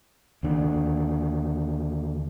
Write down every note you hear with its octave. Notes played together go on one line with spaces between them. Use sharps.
D#2 D3